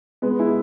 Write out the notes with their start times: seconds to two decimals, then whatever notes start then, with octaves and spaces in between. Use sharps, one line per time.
0.22 B2 G#3 B3
0.39 E4 G#4